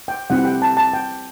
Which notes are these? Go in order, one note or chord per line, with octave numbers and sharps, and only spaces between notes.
G5
G3 C4 E4 G4 F#5
G5
A5
A5
G5